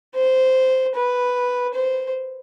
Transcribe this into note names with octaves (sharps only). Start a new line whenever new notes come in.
C5
B4
C5